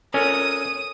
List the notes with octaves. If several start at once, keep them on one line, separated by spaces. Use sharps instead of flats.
C#4 A4 A#4 C#5 D#6 D#7